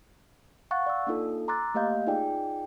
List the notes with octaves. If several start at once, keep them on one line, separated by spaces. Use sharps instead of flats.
F5 F#5 C#6 F#6 A6
D5 E6
A#3 D4 D#4 F4 A4
A#5 C6 D6 E6 F#6 A6
A3 A#3 G4 D#5 F5 G6
D#4 F4 G#4 D5 G5